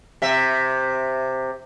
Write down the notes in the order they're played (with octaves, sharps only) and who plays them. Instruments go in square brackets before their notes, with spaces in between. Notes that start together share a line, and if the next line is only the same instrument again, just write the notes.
[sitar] C3 E5